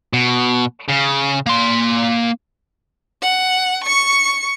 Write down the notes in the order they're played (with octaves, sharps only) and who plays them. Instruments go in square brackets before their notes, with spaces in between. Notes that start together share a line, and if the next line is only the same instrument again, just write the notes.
[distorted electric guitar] B2
C#3
A#3 C6
[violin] F#5
C#6 C#7